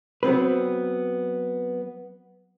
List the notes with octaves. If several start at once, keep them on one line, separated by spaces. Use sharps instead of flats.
F#3 B3 C4 B4